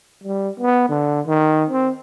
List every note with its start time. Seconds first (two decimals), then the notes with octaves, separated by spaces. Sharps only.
0.23 G3
0.60 B3
0.89 D3
1.27 D#3
1.70 C4